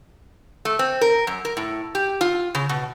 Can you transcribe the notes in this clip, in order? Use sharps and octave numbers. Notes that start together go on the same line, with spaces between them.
A3
C4
A#4
F#2
A#4
A2
G4
F4
C#3
B2